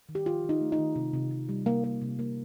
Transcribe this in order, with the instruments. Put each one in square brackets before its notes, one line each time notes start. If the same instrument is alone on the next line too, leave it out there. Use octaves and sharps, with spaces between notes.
[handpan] D#3
G4
D#3 F4
D#3
D#4
A3
D#4
D#3
C3
C3
C3
G3
C3 A#3
A#3
C3
A#3